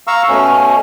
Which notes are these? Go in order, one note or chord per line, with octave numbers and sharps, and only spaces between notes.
F5 A#5 C#6 E6
B2 A3 C#4